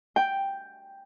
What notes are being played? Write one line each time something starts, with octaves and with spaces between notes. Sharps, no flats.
G5